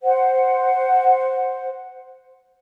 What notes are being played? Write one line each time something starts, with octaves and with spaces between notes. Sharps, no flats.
C5 F#5